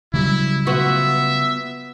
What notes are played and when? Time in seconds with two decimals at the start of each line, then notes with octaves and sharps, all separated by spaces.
0.14 C#3 F#3 G3 E4
0.67 B3 F4 F#4 E5